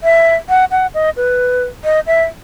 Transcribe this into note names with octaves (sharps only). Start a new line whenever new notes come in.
E5
F#5
F#5
D#5
B4
D#5
E5